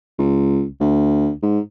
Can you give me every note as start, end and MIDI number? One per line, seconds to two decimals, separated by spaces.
0.19 0.66 37
0.80 1.31 38
1.43 1.59 44